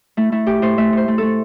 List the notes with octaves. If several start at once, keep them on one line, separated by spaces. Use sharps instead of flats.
A3 E4
A3 E4
A2 G4
A2 C5
A3 E5
A2 C5
A3
A3 A4